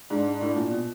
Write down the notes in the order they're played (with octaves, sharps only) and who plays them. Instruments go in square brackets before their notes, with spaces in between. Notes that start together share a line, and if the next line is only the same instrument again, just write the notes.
[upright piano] G#2 [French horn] D4
[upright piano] A2 [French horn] D4
[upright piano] A#2
B2